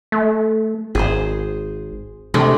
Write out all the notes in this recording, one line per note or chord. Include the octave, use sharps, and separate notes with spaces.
A3
G#1 G#4 C5
C3 G#3 A3 D4